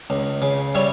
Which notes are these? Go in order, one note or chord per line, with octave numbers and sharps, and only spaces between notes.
C#2
C#3
G3 C#5 E5